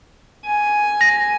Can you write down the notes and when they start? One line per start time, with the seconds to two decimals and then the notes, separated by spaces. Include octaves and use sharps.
0.45 G#5
1.01 A#6